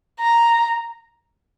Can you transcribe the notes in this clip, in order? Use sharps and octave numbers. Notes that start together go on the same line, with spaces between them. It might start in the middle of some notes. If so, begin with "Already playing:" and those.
A#5